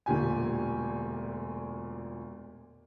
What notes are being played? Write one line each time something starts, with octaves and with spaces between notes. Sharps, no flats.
E1 D2 A#2 G4 G#5